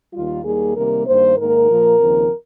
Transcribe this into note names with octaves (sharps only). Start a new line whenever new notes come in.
D#2 D#3 G3 F4
D#2 D#3 G3 A#3 G#4
C3 D#3 G3 A#3 A#4
G2 D#3 A#3 C5
G#2 D#3 A#3 A#4
A#2 F3 A#3
D#2 C#3 F3 C4